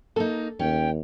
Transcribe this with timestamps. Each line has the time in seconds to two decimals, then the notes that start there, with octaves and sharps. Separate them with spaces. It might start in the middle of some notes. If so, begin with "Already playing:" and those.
0.16 A#3 D#4 A4
0.59 D#2 C#4 G5